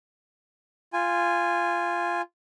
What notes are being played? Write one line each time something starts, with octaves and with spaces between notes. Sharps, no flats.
F4 G#5